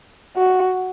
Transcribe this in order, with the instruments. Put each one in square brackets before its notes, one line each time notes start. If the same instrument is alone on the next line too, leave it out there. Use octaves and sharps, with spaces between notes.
[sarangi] F#4